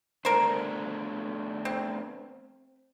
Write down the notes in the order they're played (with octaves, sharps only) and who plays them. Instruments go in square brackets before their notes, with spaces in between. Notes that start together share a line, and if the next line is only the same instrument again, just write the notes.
[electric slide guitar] A3 B3 D4 [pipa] A#4 C5
[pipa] C4